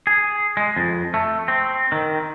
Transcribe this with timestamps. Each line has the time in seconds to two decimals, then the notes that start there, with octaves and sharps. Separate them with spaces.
0.07 G#4
0.57 G#3
0.76 F2
1.14 A3
1.48 C4
1.92 D#3